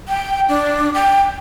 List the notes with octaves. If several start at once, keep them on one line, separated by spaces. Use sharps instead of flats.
G5
D4
G5